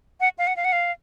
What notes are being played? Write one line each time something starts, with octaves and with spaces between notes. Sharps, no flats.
F#5
F5
F#5
F5
F#5
F5